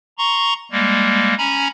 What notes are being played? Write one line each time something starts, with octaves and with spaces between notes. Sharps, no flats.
A#5 C6 C#6
G3 G#3 A#3
C#4 G#5 A#5 B5